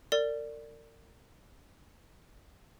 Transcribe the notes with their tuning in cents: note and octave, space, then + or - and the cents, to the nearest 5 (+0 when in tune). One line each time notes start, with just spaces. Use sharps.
A#4 -40 D5 +0